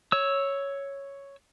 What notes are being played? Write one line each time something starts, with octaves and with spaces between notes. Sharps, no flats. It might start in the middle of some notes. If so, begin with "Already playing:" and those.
C#5 E6